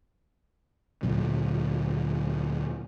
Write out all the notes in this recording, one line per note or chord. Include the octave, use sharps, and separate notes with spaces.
D2 A#2 F#3